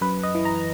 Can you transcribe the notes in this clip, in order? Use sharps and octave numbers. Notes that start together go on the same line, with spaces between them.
F#2 B4
D#5
E3
A#5